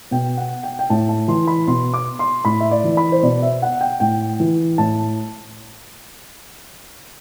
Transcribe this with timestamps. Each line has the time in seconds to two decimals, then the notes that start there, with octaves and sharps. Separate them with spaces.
0.11 B2 G5
0.37 F#5
0.63 G5
0.79 G5
0.90 A2 A5
1.09 A5
1.28 E3 C6
1.47 B5
1.67 B2 C6
1.94 D6
2.19 C6
2.45 A2 B5
2.60 E5
2.71 D5
2.84 E3
2.97 B5
3.12 C5
3.23 B2 D5
3.42 E5
3.62 F#5
3.81 G5
4.00 A2 G5
4.40 E3
4.78 A2 A5